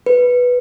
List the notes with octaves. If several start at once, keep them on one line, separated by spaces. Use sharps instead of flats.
B4